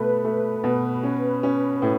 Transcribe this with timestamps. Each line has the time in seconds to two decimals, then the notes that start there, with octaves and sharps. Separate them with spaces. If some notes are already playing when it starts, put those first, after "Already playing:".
Already playing: B2 A3 B4
0.24 A3
0.64 B2
1.03 C#4
1.43 C#4
1.82 A2